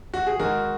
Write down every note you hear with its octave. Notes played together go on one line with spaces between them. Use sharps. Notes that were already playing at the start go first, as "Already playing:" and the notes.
F#4
G#4
D#3 G#3 F#4 A#4